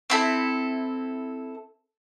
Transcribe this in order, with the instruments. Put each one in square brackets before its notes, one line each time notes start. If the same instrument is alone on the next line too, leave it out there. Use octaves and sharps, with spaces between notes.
[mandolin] C4 E4 A4